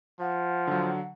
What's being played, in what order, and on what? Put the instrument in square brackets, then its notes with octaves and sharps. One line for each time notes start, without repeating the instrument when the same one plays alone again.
[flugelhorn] F3 [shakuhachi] F#5
[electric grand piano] D3 F#3